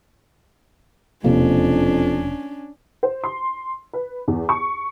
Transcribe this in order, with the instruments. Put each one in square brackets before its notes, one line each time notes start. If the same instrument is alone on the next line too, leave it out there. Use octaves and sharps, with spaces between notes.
[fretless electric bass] E1 C3 A#3 [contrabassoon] F2 [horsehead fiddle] C#4 D4
[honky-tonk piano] C5
C6
B4
E2
C#6